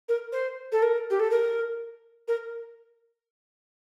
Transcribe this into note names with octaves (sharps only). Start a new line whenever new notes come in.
A#4
C5
A4
A#4
G4
A4
A#4
A#4